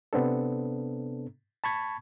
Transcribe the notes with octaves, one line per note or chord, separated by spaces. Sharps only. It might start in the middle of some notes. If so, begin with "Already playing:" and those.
C3 B3 C4 D4 A4
A5 B5 C#6 G#6